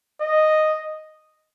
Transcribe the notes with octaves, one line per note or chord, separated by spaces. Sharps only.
D#5